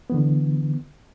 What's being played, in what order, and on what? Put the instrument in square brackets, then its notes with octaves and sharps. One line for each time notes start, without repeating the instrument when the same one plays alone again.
[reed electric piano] D3 E3 B3